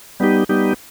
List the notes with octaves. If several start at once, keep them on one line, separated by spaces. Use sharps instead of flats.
G3 B3 D#4 G4
G3 B3 D#4 G4